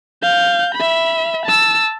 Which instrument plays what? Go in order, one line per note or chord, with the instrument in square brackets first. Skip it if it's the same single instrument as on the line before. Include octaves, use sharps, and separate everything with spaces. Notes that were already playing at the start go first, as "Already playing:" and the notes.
[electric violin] F5 G6
E5 B5
A5 E6